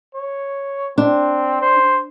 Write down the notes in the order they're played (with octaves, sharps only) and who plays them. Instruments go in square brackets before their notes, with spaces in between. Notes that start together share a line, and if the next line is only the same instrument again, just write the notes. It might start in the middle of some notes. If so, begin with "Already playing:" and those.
[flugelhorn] C#5
[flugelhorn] C4 [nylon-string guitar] D4
[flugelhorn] C5